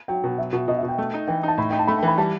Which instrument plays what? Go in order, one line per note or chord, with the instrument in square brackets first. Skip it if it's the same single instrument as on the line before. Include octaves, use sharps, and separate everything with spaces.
[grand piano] F#3 [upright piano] G5
[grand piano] B2
[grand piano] F#3 [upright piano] E5
[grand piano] B2
[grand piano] B2 [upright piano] D#5
[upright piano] E5
[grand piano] B2
[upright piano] G5
[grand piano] A3
D#4
[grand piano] E3 [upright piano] G5
[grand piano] D#4 [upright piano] A5
[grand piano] A2 [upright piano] B5
[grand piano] D#4 [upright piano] G5
[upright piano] A5
[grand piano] A3 [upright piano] B5
[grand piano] E3 [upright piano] G5
[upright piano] B5
[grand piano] G3 [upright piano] A5